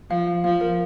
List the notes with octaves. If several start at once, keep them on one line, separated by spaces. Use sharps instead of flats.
F3 F5
F5
F3 F5
A#4